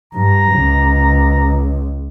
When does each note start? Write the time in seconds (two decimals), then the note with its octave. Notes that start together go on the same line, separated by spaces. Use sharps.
0.14 G2 A#5
0.53 C#2